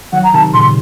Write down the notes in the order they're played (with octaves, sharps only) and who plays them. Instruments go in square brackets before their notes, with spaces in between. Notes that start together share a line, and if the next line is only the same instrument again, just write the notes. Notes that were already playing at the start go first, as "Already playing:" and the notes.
[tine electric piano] D#3 F#3 [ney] F#5
[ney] A#5
[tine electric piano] C3 D#3 [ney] A5
[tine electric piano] A#2 C#3 [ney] C6